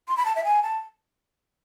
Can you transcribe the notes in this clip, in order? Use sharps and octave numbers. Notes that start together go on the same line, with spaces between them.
C6
B5
A5
E5
G#5
A5